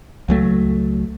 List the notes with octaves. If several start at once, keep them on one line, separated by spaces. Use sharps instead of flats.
C#2 F#3 A3